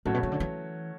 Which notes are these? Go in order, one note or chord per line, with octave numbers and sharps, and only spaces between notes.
A2 F#3 A3 C#4 F#4 C#5
B2
C#3
D3
E3